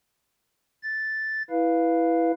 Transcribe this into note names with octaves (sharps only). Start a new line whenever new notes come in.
A6
E4 B4 F5